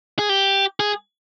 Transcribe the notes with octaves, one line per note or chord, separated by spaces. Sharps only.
G#4
G4
G#4